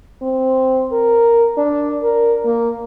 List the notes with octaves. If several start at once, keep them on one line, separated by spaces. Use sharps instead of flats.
C4
A#4
D4
A#4
A#3